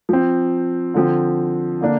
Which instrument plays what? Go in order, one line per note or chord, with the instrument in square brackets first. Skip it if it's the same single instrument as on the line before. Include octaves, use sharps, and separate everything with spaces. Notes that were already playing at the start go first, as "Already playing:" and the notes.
[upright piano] F3 C4
D3 F3 C4
D3 A#3 D4